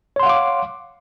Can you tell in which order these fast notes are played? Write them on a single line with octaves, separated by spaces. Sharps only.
C#5 C6 F#5 F5 D6